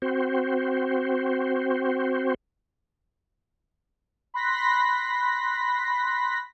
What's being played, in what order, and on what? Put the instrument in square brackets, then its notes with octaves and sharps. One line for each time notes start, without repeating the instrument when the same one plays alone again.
[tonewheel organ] C4 F#4 C5
[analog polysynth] B5 C6 F#6 A#6 B6